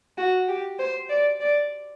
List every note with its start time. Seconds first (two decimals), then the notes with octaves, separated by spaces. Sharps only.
0.18 F#4
0.48 G4
0.79 C5
1.10 D5
1.40 D5